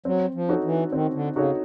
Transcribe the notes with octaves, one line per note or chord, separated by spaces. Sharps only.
F#3 C4
F3
D#4 F#4 A4 C#5
E3
D#3 C4
D3
C#3 D#4 F#4 A4 C#5